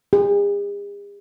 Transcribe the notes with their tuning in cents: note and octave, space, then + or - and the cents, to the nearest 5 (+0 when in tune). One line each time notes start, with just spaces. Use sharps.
G#4 -45